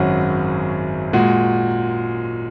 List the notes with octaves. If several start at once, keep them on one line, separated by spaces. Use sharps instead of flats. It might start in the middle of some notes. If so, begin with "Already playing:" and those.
Already playing: G#1 F#2 F#3 C#4 F#4
A#2 G#3 F#4